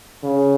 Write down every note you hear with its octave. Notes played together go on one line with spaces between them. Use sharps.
C#3